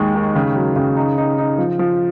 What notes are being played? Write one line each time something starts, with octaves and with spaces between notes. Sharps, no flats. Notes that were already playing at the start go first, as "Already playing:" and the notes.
Already playing: D#2 G#3
D#3
C#3
F#3
C#3
D#4
D#4
D#4
F3
F3